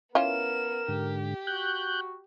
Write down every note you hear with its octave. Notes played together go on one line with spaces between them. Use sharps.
E3 B3 C#4 F4 A#4 E7
G#2 D3 G4
F#4 F#6 G6